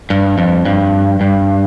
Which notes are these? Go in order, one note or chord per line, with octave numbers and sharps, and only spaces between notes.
G2
F2
G2
G2